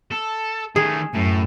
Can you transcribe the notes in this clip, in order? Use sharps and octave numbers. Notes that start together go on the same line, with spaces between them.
A4
D#3 A3 G#4
F#2 A2